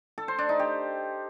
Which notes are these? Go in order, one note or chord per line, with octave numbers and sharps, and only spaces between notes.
A4
C5
D4
D#4
G4